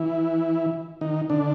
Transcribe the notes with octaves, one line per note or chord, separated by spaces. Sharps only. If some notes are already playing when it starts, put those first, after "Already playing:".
Already playing: E3 E4
D#3 D#4
D3 D4